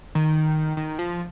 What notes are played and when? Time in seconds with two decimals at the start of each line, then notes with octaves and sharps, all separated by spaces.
0.15 D#3
0.77 D#3
0.99 F3